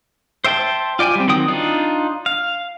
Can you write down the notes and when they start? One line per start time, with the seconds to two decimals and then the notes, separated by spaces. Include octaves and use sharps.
0.44 C5 E5 G5 A5 C6
0.99 F4 D5 G5 G#5
1.15 G3 C4
1.28 D#3 F#3 C4 G5 D#6
1.48 D4 D#4 F4
2.26 F5